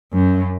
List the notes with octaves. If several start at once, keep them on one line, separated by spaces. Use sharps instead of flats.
F#2